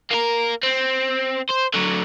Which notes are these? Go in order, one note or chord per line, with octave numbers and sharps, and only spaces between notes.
A#3 A#4
C4
C5
D3 F#3